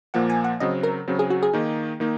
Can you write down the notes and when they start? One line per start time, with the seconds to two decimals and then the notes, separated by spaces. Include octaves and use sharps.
0.14 A#2 F3 A#3 F#5
0.30 G#5
0.44 F#5
0.60 C#3 F#3 C4 D#5
0.83 A#4
1.08 C#3 F#3 C4
1.19 G#4
1.30 F#4
1.43 G#4
1.53 D#3 A#3 D#4
2.00 D#3 A#3 D#4